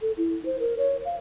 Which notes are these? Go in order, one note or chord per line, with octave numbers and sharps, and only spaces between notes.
A4
E4
C5
A#4
C#5
F5